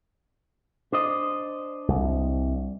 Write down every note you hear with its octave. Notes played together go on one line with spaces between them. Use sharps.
D4 C5 D#5
C2